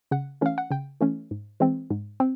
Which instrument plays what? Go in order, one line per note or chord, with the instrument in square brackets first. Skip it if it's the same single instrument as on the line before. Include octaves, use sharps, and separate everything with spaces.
[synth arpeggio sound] C#3 F#5
E3 A3 C#4 F5
F#5
C#3 G5
E3 A3 C#4
G#2
E3 G#3 C4
G#2
C4